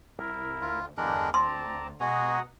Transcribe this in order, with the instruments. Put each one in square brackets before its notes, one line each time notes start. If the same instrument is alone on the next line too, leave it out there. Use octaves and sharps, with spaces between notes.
[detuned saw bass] C2 [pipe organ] E4 A#4
[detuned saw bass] D2 [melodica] F4
[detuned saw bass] E2 [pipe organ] G2 D3 F#6 [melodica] G#3 D4 A#4
[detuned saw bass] D2 [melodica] C4 [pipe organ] D5 A5 A#5 [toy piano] C6
[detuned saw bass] B2 [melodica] G#3 F#4 G#4 [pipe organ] F#5 A#5 D#6